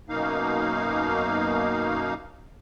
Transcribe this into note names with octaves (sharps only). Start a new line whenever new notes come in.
F#2 B2 A#3 D#4 F5